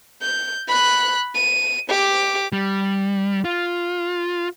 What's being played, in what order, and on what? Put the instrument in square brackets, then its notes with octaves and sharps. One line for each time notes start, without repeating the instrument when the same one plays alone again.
[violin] G6
B5 F#6
D#7
G4 D6
[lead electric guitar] G3
F4